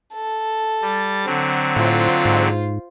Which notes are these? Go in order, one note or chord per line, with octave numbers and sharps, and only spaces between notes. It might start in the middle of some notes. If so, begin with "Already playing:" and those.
A4
G3 A6
D3 F#3 C4
A2 F4 C5
G#2